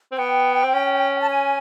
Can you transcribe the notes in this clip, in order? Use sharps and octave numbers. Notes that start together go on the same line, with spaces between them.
C4
B3 G5
C4
C#4
A5
G#5